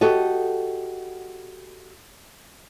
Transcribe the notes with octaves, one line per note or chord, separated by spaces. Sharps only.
F#4 G4 A4 D#5